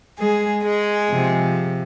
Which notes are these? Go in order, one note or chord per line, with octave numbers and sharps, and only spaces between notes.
G#3 G#4
G#3 G#4
C3 F3